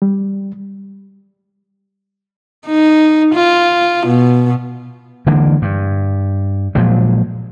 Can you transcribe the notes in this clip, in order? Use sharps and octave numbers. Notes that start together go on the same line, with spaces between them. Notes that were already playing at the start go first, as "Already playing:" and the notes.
G3
D#4
F4
B2
D3 E3 G#3 A#3
G2
A#2 F3 F#3 G#3